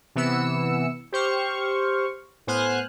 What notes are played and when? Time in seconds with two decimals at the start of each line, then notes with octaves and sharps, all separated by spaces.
0.15 C3 E3 B3 E6 C#7
1.12 G4 C5 C#6 F6
2.47 A2 B3 C5 G#5 F6 F#6